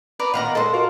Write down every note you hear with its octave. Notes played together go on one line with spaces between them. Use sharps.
B4 D5 A#5
A#2 D#3 B3 F5 F#5 A#5
G#3 A#3 C#4 A4 C5
F4 F#4 A#4